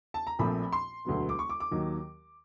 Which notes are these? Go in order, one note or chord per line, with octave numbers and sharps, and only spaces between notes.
A5
A#5
A#1 A#2 F3 A3 C4 B5
C6
E1 D2 D3 F#3 B3
D6
C#6
D6
D6
D#2 D#3 F#3